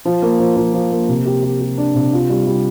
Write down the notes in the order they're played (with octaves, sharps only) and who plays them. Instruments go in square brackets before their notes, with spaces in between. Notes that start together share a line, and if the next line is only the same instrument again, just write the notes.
[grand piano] F3
A#3
F3
F3
F3
A#3
C3
G4
G4
G4
D4
C3
F4
G3
G3